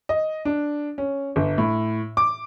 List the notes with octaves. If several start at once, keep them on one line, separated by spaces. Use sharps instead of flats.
D#5
D4
C#4
G1
A2
D6